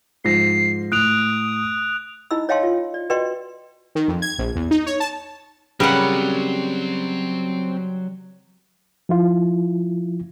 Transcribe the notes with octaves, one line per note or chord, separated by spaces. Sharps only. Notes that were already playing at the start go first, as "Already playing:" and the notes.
G#2 F3 A#6 C7
A2 D#6 F#6 D7 F7
D#4 E4 D#5 B5 E6
C#5 D#5 F5 G5 A5 C6
F4
D5
F#4 B4 D5 D#5 G5 C6
D#3
F2
G#6
A#1
E2
D#4
C#5
A5
C#3 F#3 G3 C4 A#4 B4 F#5 B5
F3 E4 F4